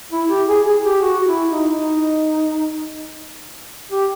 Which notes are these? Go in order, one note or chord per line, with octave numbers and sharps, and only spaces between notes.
E4
G4
G#4
G#4
G4
F#4
E4
D#4
D#4
G4